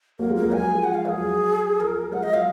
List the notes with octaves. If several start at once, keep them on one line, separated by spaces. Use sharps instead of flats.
F#3 A#3 A#4
F3 G#3
A#4
F#3 A#3
F#3 G#5
F3 G#3
F#5
F5
A#4
F3 G#4
F#3
F3 A#4
F#3
F3 G#3 F#5
F3 D#5
F#3 F5